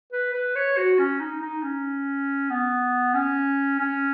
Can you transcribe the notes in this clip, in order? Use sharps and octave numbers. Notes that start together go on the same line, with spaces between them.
B4
B4
C#5
F#4
C#4
D#4
D#4
C#4
B3
C#4
C#4